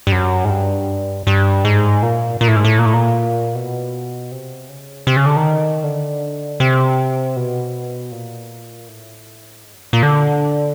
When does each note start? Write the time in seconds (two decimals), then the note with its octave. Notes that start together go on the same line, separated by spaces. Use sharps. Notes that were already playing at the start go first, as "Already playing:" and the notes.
0.07 G2
0.12 F#2
0.45 G#2
0.50 G2
1.27 G2
1.65 G#2
2.03 A#2
2.41 A#2
2.48 A2
2.56 G#2
2.64 A2
2.79 A#2
2.86 A2
2.93 A#2
3.55 B2
4.32 C3
4.69 C#3
5.07 C3
5.17 C#3
5.26 D3
5.36 D#3
5.84 D3
6.60 C3
7.36 B2
8.12 A#2
8.88 A2
9.64 G#2
9.74 F#2
9.84 G2
9.93 A#2
10.03 D3